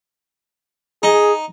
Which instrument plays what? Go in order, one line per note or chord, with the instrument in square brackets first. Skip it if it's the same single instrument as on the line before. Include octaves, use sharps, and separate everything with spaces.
[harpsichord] D#4 [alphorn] G#4